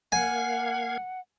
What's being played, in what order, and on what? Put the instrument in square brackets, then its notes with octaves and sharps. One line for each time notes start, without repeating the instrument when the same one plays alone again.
[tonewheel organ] A#3 F5 G#6 [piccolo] F#5 [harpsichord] G#5